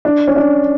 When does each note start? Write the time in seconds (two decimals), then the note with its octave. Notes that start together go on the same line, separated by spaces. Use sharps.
0.05 D4
0.27 C#4
0.36 D4